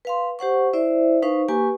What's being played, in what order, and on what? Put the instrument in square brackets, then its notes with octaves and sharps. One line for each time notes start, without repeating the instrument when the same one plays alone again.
[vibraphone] B4 F5 C6
G4 C5 F#5 C#6
E4 C5 D5 E5
D#4 B4 C5 F5 C#6
A#3 G4 B4 G#5 C#6